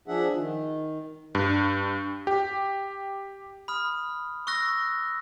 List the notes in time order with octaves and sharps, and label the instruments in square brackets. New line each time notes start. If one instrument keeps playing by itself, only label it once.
[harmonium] F3 D4 G#4 E5 F#5
D#3
[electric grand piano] G2
G4
[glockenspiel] B5 D#6 F6
C#6 E6 F#6 A#6